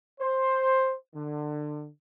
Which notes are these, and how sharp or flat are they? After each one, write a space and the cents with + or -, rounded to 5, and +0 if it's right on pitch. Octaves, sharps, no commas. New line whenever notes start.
C5 +10
D3 +25